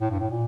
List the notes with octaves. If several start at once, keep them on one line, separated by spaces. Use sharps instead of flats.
A2
G2
A2
A#2